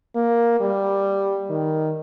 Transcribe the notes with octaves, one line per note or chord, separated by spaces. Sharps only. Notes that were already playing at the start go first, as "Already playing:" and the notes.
A#3
G3
D#3